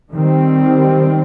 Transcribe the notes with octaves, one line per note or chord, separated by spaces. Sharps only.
D#3 G3 C4